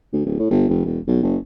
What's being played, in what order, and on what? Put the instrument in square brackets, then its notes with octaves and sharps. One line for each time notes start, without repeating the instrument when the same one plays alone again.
[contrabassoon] D2
D1
A2
G1
F1
E1
B1
F#1